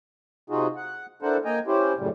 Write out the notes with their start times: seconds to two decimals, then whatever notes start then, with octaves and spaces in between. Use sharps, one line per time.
0.50 C3 D#4 F4 F#4 G#4
0.76 F#5
1.22 D4 E4 A4 A#4 C5 F#5
1.45 A#3 D#5 G5 G#5 A#5
1.67 C#4 E4 G4 C5
1.98 F#2 A2 C#3 G3